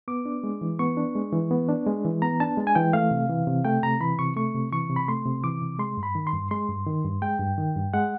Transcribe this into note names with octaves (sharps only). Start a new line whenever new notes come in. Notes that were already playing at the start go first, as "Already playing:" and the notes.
B3 D6
D4
G#3
E3
B3 C#6
D4
G#3
E3
B3
D4
G#3
E3
B3 A#5
D4 A5
G#3
G#5
E3 G5
A3 F5
C3
E3
C3
A3 G5
C3 A#5
E3 B5
C3 C#6
A3 C#6
C3
E3 C#6
C3
B5
A3 C6
C3
E3 D6
C3
G#3 C6
G2
B5
D#3
C6
G2
G#3 C6
G2
D#3
G2
G#3 G5
G2
D#3
G2
G#3 F#5